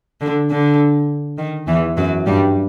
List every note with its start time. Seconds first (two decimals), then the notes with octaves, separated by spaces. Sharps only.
0.21 D3
0.50 D3
1.38 D#3
1.68 E2 E3
1.97 F#2 F#3
2.26 G2 G3